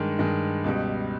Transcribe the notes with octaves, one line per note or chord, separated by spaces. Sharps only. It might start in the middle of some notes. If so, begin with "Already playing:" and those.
Already playing: G2 D#3 G#3
G2 D#3 G#3
C#2 B2 G3